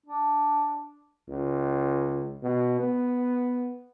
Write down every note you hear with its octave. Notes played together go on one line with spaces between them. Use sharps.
D4
C#2
B2
B3